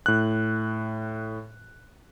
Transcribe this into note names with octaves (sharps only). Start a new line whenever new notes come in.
A2 F#6